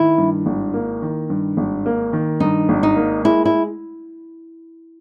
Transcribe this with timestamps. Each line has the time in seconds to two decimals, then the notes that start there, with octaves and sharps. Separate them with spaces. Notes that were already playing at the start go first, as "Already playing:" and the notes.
Already playing: D#3 E4
0.18 G2
0.46 G#1
0.74 A#3
1.02 D#3
1.30 G2
1.57 G#1
1.86 A#3
2.13 D#3
2.40 G2 D#4
2.69 G#1
2.83 D#4
2.96 A#3
3.25 G#3 E4
3.45 E4